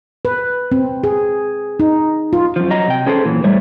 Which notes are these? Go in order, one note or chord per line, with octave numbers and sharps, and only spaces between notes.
B4
C4
G#4
D#4
F4
F#2 F3
F#3 D#5 A#5
C3 G5
C#4 G#4 A4 B4 C5
A#2 E3 F#3
A2 G3 A3 C5 C#5